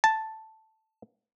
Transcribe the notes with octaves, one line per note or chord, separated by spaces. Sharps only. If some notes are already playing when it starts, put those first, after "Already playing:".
A5